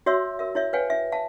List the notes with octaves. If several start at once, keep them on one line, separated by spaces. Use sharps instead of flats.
F#4 C#5 E5 C6 E6
A#4 E5
E4 C#5 E5
B4 C#5 F5 G5 G#5
E4 E5
E5 F5 A5